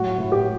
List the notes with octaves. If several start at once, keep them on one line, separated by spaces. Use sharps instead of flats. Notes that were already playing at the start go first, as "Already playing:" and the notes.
Already playing: A2 F#3 F#4
A2
G4